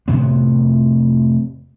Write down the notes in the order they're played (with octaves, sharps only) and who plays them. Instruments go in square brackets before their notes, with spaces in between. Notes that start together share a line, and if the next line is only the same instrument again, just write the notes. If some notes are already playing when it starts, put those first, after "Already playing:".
[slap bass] F2 A2 C3 B3